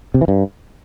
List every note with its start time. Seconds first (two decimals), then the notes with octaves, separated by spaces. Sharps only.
0.14 C3
0.21 E3
0.28 G2